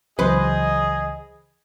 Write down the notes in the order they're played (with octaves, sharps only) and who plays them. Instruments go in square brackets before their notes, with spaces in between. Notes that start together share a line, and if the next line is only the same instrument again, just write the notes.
[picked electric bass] C#2 E3 F#3 [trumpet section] G#4 D#5 [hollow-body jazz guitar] B4 C5